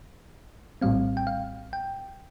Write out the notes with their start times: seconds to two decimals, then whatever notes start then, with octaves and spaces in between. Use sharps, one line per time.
0.81 A#1 A2 G3 C4 F5
1.17 G5
1.27 F5
1.73 G5